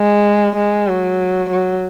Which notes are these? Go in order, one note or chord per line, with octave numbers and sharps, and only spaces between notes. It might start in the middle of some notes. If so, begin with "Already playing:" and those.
Already playing: G#3
G#3
F#3
F#3